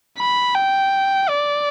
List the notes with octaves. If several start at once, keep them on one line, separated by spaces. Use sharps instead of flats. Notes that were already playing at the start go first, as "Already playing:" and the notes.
B5
G5
D5